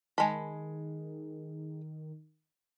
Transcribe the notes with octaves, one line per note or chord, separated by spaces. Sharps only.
D#3 G#3 G#5 A5 B5